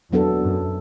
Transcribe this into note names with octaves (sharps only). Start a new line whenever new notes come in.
E2 F#3 B3 D4 A4
F#2